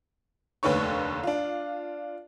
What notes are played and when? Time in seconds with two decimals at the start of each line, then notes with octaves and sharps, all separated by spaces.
0.63 F1 D#2 D3 B4 C#5 C#6
1.23 D4 F4